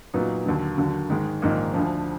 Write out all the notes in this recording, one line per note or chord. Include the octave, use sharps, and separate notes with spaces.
A#2 F#3 B3 D#4
D#2 D3 F#3
D#2 D3 F#3
G#2 D#3 G#3
A#1 G#2 D#3 A#3 D#4
D2 D3 F3